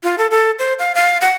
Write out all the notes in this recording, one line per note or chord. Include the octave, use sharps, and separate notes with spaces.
F4
A4
A4
C5
F5
F5
F#5